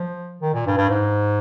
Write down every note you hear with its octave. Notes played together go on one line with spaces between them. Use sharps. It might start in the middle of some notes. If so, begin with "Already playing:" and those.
Already playing: F3
D#3
A#2
G2
G2
G#2